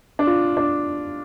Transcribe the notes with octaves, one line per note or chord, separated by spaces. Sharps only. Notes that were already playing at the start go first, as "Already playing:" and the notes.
D4
F4
D4